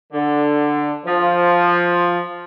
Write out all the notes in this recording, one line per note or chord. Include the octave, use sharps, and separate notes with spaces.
D3
F3